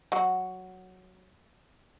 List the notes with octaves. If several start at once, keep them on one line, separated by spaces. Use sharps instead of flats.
F#3 F#4